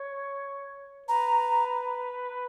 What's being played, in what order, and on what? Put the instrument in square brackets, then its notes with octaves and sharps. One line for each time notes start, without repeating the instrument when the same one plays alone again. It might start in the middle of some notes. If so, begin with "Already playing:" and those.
Already playing: [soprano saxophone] C#5
[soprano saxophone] B4 [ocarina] A#5